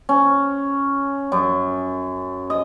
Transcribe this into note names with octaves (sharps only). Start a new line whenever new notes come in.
C#4
F#2
D#5